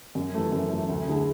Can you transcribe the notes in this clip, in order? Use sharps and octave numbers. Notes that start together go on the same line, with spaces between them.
F#2
E3 A3
F#2
E3 A3
D2
D3 A3 E4 G#4